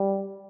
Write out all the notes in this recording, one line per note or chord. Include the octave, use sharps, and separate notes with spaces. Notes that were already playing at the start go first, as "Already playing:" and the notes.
Already playing: G3